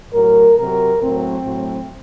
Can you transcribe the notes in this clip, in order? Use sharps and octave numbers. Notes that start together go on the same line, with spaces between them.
A2 F#3 A#4
C3 F#3 A#4
A2 F#3 C4
A2 F#3